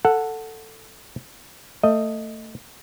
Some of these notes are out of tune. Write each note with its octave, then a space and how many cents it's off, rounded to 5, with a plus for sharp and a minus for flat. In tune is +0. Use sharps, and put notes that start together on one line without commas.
A4 +10 F#5 -5
A3 +20 D#5 +0